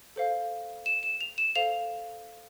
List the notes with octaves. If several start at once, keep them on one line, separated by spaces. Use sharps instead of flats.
A4 C5 F5
E7
E7
F7
E7
A4 C5 F5 F7